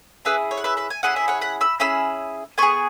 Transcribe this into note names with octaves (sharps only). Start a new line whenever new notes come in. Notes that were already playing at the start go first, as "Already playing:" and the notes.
C#4 E4 G#4 B4 E5
C#5
F#5
B4 E5
B4 E5
G#5
C#4 E4 G#4 F#5
E5
C#5 F#5
F#5 B5
B5 E6
C#4 E4 G#4 B5 E6
B3 G#4 G#5 C#6